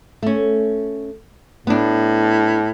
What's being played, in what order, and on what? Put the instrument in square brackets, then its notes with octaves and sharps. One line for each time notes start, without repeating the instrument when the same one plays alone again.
[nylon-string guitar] A3 C#4
[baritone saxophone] A2 [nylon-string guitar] B3 D4